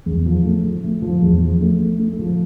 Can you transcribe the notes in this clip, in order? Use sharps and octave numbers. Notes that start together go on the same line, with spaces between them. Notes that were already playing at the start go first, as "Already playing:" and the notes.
E2
F3
A3
F3
A3
F3
E2
F3
A3
A3
A3
F3